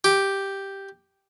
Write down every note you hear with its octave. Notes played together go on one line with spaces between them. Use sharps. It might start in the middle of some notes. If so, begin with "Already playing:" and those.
G4